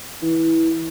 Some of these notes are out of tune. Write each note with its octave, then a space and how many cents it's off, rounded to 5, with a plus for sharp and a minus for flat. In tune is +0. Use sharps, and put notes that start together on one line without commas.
E3 -15